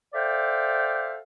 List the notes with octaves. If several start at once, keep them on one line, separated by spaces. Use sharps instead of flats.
A4 C5 D5 E5 F5 G5